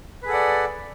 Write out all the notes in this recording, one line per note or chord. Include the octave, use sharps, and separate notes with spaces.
G#4 A4 B4 D5 F#5